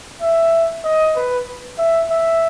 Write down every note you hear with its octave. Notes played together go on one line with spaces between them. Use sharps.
E5
D#5
B4
E5
E5